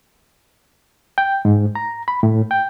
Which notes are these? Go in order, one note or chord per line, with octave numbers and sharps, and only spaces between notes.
G5
G#2
A#5
B5
A2
G5